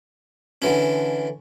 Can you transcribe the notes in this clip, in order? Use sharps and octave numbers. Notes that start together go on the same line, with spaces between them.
D3 E3 C#4